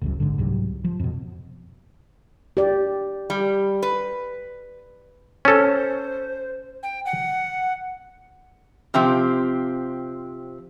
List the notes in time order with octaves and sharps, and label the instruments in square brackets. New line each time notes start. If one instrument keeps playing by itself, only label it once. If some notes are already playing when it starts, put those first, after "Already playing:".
[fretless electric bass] F1 C#2 F#2
G#1 G#2 D3
C2 G#2 C3 F#3
F3
F2 B2
[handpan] G4 D5
[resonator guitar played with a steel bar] G3
B4
[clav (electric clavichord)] C#4 A4 [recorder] C5
[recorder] G5
F#5
[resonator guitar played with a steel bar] C3 F3 C4 G4